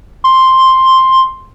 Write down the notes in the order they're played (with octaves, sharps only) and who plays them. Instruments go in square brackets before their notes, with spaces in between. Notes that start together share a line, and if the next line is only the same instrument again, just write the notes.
[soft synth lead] C6